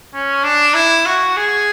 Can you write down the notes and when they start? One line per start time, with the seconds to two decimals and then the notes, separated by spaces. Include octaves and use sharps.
0.14 C#4
0.44 D4
0.74 E4
1.06 F#4
1.37 G#4